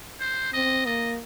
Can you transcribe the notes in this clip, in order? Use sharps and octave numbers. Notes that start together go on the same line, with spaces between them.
C5
C4 D#5
A#3 D#5